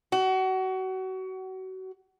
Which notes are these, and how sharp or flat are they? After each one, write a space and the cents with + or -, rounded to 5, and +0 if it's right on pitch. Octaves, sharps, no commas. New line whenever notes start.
F#4 +30